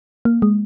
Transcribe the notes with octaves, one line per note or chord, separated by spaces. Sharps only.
A#3
G#3